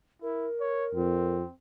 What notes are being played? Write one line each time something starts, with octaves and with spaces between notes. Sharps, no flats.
E4 A#4
C#5
F2 C4